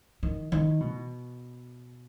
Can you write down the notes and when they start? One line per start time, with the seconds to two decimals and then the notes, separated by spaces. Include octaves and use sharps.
0.23 D#3
0.52 D#3
0.80 B2